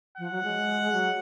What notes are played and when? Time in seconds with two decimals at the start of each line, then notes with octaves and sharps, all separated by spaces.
0.18 F3 F#5
0.31 F#3
0.43 G#3
0.92 F#3